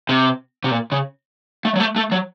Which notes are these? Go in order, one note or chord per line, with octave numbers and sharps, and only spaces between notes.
C3
C3
A#2
C#3
A3
F#3
A3
A3
F#3